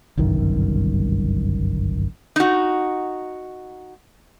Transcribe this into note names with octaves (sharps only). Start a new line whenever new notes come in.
G1 C2 F#2 D#3
D#4 F#4